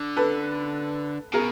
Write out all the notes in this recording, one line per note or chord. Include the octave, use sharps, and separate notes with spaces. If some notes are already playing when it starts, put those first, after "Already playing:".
Already playing: D3
A4 B4
B2 G#4 A#4